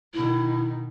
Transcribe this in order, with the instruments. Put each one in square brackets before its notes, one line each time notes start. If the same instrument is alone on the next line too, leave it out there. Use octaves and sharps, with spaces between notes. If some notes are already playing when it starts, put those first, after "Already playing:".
[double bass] B2 D#3 [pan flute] E4